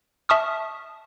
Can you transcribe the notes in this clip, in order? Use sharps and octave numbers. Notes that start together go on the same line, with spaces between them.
E5 A5 C#6 D#6 F6